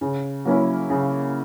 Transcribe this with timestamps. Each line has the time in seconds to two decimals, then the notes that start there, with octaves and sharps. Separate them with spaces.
0.01 C#3
0.45 F#3 A#3 C#4 E4
0.90 C#3